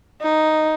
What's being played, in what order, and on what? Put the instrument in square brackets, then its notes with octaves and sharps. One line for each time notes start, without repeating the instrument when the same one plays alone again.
[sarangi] D#4